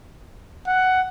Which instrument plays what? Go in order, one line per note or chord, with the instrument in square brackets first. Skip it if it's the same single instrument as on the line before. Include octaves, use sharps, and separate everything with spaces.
[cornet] F#5